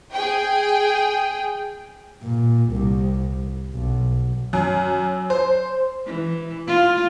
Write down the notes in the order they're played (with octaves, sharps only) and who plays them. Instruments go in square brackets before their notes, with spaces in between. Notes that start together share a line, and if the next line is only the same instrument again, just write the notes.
[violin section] G#4 G5
[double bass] A#2
C2
B1
[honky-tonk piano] F#2
C5
[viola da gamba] E3
F4